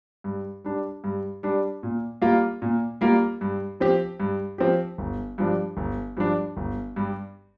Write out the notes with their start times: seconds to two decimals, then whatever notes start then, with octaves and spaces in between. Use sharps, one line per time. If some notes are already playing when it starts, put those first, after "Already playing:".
0.24 G2
0.64 G3 D4
1.04 G2
1.43 G3 D4
1.83 A#2
2.22 G3 A#3 F4
2.62 A#2
3.01 G3 A#3 F4
3.41 G2
3.80 F3 C4 G4
4.20 G2
4.58 F3 C4 G4
4.98 G1
5.38 G2 F3 D4
5.77 G1
6.17 G2 F3 D4
6.57 G1
6.96 G2 G3